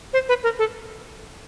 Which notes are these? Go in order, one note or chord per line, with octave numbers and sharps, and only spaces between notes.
C5
B4
A#4
A4